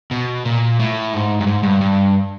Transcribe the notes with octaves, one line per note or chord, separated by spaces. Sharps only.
B2
A#2
A2
G#2
G2
G#2
G2
G2